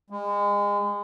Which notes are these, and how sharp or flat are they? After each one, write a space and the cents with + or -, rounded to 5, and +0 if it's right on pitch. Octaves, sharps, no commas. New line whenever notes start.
G#3 -30